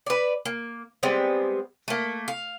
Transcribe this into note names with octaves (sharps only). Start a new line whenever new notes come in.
B4 D5
A#3
G3 G#3 B3 C4
A3 A#3
F5